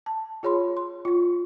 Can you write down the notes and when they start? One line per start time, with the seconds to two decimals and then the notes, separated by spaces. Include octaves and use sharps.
0.06 A5
0.43 F4 G#4 C#5 B5 C6
0.77 C6
1.05 F4 C#6